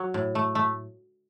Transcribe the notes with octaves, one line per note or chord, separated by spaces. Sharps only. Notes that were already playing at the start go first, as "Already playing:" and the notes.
Already playing: F#3
A2
A3
A3